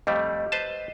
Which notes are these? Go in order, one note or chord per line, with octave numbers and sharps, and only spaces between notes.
F2 G3 A3 D#5
B4 C5 A5